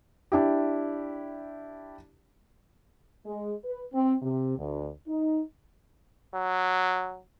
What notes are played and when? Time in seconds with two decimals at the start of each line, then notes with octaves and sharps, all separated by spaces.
0.32 D4 E4 G4
3.25 G#3
3.64 B4
3.93 C4
4.22 C3
4.58 D2
5.08 D#4
6.35 F#3